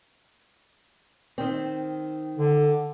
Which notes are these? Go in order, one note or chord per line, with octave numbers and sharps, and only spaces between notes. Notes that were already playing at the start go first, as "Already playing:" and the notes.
D#3 C4
D3